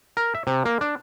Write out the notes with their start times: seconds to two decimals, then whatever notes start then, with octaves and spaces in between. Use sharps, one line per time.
0.17 A#4
0.35 E5
0.47 C3
0.65 A#3
0.81 D4